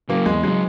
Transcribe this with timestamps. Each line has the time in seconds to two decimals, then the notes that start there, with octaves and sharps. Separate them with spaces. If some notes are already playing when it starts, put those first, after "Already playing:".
0.09 C#3 F#3 A#3
0.26 E2 G#3
0.43 C#3 F#3 G#3